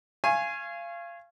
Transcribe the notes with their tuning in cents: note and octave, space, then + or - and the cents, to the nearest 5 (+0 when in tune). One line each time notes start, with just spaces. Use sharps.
F5 -25 G#5 +0 C#6 -25